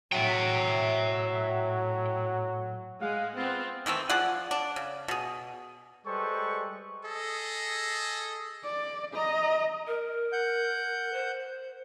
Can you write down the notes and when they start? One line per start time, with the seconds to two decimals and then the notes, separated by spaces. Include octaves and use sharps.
0.13 A2 F#3 E5 G5
3.01 G#3 F5 F#5
3.37 B3 C4 F4
3.86 D#3 E3 A3 C4
4.10 F3 G#4 D5 F#5
4.51 D4
4.76 C#3
5.08 B2 G#4
6.05 G3 G#3 A4 B4 C5 C#6
7.05 G#4 A4 D#5
8.64 D5
9.14 D#5 A#5
9.87 A#4
10.32 F#5 G6
11.13 C5